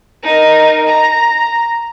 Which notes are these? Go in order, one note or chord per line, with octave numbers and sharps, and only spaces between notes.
D#4 A#4
A#5